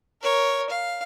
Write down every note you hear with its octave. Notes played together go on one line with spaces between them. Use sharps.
A#4 C#5
F5